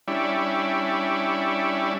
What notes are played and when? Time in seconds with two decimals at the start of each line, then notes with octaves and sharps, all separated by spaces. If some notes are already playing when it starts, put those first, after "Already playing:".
0.08 G3 C#4 D4 E4